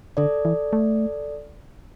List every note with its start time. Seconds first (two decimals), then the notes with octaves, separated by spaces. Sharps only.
0.17 D3 A4 D5
0.45 E3
0.73 A3